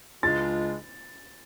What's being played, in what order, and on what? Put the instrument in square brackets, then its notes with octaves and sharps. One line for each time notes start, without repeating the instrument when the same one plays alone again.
[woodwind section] C#2 C#3 G#3 D4 F4 [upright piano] A6